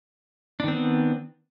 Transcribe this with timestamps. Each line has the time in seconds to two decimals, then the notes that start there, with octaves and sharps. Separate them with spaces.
0.60 D4
0.64 D#3
0.68 C4
0.72 B3